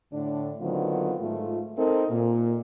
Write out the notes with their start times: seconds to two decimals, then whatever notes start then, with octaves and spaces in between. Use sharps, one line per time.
0.13 A2 D3 D4
0.60 D3 D#3 F#3 B3 C4 F4
1.20 G#2 A3 F4
1.78 C4 D#4 A4 A#4
2.10 A#2